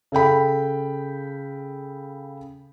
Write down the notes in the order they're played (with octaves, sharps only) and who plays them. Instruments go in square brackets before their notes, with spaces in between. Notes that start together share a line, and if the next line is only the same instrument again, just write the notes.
[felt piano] C#3 A4 G5 B5